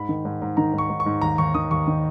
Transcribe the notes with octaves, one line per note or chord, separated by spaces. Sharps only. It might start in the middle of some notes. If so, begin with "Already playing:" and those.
Already playing: G#2 B5
D#3
G#2
G#2
D#3 A#5
G#2 C#6
G#2
C#6
G#2
D#2 A#5
D#2 C#6
D#3 D#6
D#2 C#6
D#3